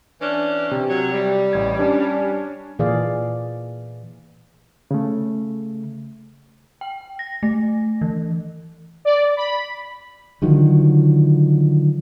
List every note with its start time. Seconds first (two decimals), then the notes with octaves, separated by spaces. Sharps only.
0.21 E3 C#4 D4
0.71 C3
0.89 F#3 C#5
1.14 G3
1.53 A1 G#6
1.79 C#4 D4
2.79 A#2 E3 G#4 D5 F5
4.91 C#3 A3
6.81 G5
7.19 A#6
7.43 A3
8.01 E3
9.05 D5
9.37 B5
10.42 D3 D#3 F3 F#3